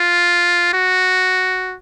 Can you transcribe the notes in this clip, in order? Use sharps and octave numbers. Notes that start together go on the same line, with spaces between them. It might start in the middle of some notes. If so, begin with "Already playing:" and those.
Already playing: F4
F#4